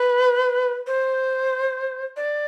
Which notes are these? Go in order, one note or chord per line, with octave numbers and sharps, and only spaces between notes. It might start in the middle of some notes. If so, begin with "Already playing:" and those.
Already playing: B4
C5
D5